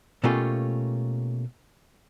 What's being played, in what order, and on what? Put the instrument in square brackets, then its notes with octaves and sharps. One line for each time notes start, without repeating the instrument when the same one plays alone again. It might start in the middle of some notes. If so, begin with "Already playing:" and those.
[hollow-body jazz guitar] B2 A3 A#3 C#4 F4 G4